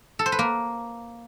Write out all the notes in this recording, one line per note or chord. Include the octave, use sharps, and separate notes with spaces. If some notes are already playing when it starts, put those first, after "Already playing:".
A4
C5
B4
A#3